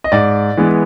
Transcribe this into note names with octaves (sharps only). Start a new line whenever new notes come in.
D#5
G#2 D5
E3 G#3 B3